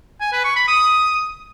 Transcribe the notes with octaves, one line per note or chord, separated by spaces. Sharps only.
G#5
B4
C#6
B5
D#6